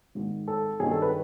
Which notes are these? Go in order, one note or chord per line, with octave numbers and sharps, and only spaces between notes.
G#1 G#2 D#3
A4
G#1 G2 D#3 G#4
A4
B4